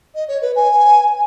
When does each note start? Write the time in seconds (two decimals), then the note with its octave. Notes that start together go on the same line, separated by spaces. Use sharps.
0.14 D#5
0.28 C#5
0.41 B4
0.55 G#5